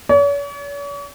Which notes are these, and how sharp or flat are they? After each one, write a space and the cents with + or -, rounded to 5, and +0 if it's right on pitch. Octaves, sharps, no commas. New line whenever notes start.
C#5 +45